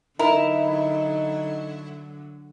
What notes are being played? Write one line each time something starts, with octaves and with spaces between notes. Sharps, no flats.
D3 F#3 D#4 E4 A#4